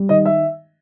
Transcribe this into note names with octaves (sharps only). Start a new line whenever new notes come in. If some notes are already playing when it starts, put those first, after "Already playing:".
Already playing: G3
D#3 D#5
E5